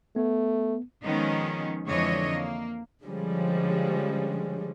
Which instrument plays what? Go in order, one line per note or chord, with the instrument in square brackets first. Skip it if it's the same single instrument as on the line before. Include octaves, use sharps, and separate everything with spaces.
[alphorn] A3 [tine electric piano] B3
[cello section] D#3 F3 G#3 B3 C#4 D#4
F2 D3 E3 G#3 C#5 D#5
A#3
[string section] D3 F3 G3 G#3 C#4